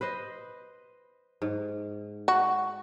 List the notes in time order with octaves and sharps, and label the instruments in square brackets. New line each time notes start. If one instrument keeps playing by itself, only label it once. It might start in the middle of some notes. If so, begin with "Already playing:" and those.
[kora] B4 C5 D#5
G#2
[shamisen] F#4